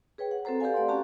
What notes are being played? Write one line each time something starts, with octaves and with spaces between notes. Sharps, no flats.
G#4 B4 C#5 G5
F#5
C4 F#4 A4 C5 A#5
G4 A4 B4 D5 F5 G#5
A3 D5 F#5 C6
C#4 F#4 G4 A5 A#5